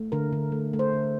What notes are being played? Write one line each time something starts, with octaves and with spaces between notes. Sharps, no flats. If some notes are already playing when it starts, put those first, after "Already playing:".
Already playing: A3
D3 A#4
D3
A3
A3
C5
D3